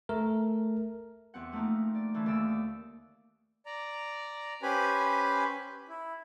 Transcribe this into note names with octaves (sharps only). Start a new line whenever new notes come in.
A3 A#4
E2 C4 F#5
F3 A3 A#3 C4 D#4
D5
D3 E3 A3 C#4
D#2 D5 E6
D5 A#5
C#4 G4 B4 C5 G#5 B5
E4